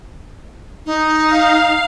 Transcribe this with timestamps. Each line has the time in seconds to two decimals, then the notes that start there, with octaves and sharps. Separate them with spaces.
0.86 D#4
1.26 F5